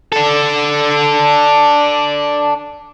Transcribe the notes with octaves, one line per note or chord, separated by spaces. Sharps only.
D4 A4